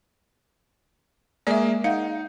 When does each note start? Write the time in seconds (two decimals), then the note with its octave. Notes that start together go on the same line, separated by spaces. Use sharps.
1.47 G#3 A#3 G#4 D5 E5
1.84 D#4 F5 F#5